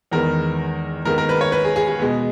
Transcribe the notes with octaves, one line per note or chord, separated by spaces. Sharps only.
E2 D#3 G#3 B3 A#4
D#2 D#3 G#3 B3 A#4
A#4
B4
C#5
B4
G#4
G#4
G#4
B2 G#3 B3